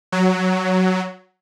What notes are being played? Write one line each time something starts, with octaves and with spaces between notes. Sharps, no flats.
F#3